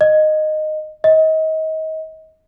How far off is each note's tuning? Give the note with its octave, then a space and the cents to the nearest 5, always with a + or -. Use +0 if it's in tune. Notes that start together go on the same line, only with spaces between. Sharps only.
D#5 -10
D#5 +30